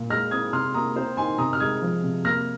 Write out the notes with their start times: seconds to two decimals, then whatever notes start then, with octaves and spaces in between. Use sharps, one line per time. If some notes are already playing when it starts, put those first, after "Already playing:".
Already playing: A#2
0.10 G#3 F6 A#6
0.31 C4 D#6 G#6
0.53 C3 C6 F6
0.74 A#3 A#5 D#6
0.96 C4 C5
1.17 D#3 G#5 C6
1.38 C3 A#5 D#6
1.53 F6
1.60 G#3 D#6 G#6
1.82 F3
2.03 C3
2.24 A#3 F6 A#6